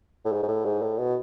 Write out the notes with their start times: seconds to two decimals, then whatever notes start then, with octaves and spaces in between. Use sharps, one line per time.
0.25 A2
0.32 G#2
0.43 G#2
0.48 A2
0.65 G#2
0.82 A2
0.98 B2